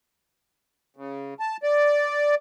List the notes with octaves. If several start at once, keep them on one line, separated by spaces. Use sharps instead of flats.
C#3
A5
D5